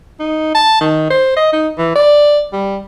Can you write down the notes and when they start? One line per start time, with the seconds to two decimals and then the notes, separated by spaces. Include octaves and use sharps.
0.19 D#4
0.55 A5
0.81 D#3
1.11 C5
1.37 D#5
1.53 D#4
1.78 E3
1.95 D5
2.53 G3